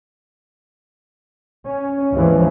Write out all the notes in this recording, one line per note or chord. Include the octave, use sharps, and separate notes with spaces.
C#4
D#2 G#2 E3 F3